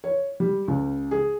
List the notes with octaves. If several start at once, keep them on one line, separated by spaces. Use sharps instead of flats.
C#5
G3
C#2
G#4